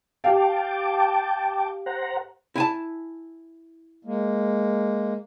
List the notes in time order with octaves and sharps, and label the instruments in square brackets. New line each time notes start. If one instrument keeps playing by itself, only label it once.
[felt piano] G4 F5 [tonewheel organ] G5 A5 D6
[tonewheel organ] C5 F#5 A#5
[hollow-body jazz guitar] E4 G#5 A5
[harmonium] G#3 A#3